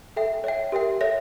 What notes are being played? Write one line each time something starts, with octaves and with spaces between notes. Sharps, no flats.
A4 E5 G5
C#5 E5 G5
G4 A#4 E5 G5
A4 C#5 E5 A#6